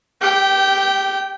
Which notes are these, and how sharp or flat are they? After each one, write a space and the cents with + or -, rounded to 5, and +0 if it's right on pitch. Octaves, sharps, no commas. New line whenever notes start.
G4 +5 G5 -20